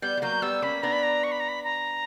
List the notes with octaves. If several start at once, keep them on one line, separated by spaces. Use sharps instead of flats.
G3 B3 G6
G3
F#3 A#3 G6
G3 B3 E6
A#3 C#4 B5
B3 D4 A#5
B5
A#5
C#6
B5
A#5
B5
A#5